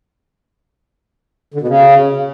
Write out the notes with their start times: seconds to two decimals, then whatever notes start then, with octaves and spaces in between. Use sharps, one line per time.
1.54 D3
1.61 B2
1.68 C#3